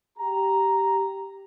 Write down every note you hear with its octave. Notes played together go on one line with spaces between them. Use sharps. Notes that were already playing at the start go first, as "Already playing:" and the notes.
G4 A#5